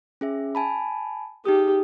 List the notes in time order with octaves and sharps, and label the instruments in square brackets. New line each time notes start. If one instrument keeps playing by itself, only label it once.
[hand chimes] C#4 G#4 E5
G#5 A5 B5
[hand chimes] D#4 G#4 D#6 [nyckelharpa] G4